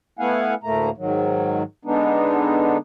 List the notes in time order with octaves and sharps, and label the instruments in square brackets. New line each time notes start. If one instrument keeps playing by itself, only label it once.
[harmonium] A3 B3 E4 F5 F#5 G#5
D2 A2 A3 A#3 A#5
G#2 D#3 F#3
D3 G#3 B3 D4 D#4